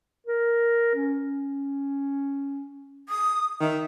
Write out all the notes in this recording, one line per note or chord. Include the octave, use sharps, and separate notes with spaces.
A#4
C#4
D#6
D#3 E5